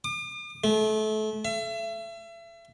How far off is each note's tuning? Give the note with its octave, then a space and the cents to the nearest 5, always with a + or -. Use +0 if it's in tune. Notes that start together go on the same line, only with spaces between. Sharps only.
D6 +45
A3 -30
E5 +35